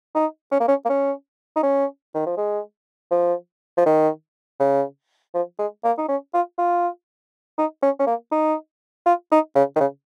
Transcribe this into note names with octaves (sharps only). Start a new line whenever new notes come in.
D#4
C#4
A#3
C#4
A#3
C#4
D#4
C#4
D#3
F3
G#3
F3
F3
D#3
C#3
F3
G#3
A#3
D#4
C#4
F4
F4
D#4
C#4
C#4
A#3
D#4
F4
D#4
C#3
D#3
C#3